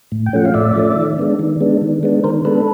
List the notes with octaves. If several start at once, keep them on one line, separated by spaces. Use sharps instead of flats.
A2
G5
F3 A3 C#4 F#5
F5
A2 D5 E5
F3 A3 C#4
D#3
G#3 B3 D4
D#3
G#3 B3 D4
D#3
G#3 B3 D4
D#3 A#4 C5
G#3 B3 D4 A4 B4